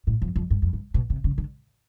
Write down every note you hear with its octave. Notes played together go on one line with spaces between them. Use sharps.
A2
F2
F2
G2
F2
G2
B2
C3
C#3
D3